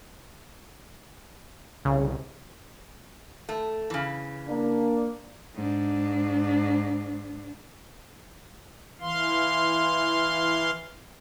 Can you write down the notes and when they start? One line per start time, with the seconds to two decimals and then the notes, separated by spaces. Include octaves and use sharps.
1.85 C2 C#3
3.49 A3
3.90 C#3 E3
4.48 A#3 D4
5.55 G#2 D4
9.01 E3 F5 C6